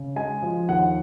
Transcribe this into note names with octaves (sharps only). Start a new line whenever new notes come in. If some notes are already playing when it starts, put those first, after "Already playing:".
Already playing: C#3
G#3 G#5
F3
D#2 F#5